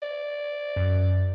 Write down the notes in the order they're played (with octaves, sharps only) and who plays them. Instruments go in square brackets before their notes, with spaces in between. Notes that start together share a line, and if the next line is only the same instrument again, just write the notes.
[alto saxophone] D5
[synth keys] F#2